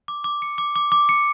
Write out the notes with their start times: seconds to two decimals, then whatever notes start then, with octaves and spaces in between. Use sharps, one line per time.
0.08 D6
0.24 D6
0.42 C#7
0.58 D6
0.76 D6
0.92 D6
1.09 C#7